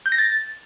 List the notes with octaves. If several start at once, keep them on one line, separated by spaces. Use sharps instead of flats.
G6
A#6
A6